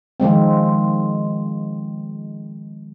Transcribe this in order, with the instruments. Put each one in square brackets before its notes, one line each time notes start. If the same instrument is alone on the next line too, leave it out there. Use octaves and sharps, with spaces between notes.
[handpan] D#3 F3 G#3 C4